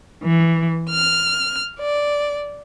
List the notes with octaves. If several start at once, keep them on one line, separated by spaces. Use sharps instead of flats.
E3
F6
D5